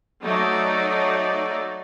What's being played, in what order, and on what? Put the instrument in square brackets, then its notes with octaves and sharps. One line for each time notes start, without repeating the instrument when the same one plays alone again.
[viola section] F#3 A3 D#4 D5